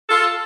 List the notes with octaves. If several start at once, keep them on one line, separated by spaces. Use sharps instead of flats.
F4 A4